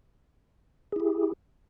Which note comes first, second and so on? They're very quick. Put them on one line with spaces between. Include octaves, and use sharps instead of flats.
G#4 E4 G4